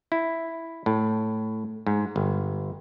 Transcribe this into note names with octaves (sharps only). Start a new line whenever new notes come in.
E4
A2
G#2
G1